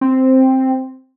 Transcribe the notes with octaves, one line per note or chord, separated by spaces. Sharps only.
C4